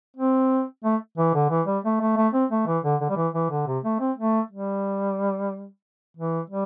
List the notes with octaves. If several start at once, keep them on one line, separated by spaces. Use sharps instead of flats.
C4
A3
E3
D3
E3
G3
A3
A3
A3
C4
A3
E3
D3
D3
G3
E3
E3
D3
C3
A3
C4
A3
G3
E3
G3